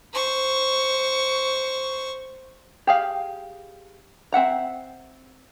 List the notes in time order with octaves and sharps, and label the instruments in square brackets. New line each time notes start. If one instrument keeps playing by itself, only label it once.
[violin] C5 C#6
[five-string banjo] G4 G#4 F5
C4 E5 F#5 A#5